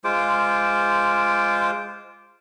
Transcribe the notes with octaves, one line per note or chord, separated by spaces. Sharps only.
G#3 F4 C5 D6